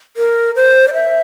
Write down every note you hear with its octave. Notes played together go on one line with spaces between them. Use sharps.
A#4
C5
D5
E5